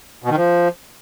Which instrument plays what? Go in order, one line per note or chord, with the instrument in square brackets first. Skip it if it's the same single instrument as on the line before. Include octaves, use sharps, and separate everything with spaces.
[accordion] B2
D#3
F3